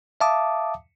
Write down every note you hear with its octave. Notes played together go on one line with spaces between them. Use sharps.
E5 F5 A5 D6 D#6